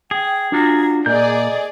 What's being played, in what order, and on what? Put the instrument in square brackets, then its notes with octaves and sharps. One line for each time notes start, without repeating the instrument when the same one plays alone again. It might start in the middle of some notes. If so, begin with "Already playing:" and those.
[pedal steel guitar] G#4 [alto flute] G5
[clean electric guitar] D4 F4 F#4 [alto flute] A#5
[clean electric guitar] A#2 A#4 [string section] G#4 D5 [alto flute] D#5 [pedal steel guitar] G6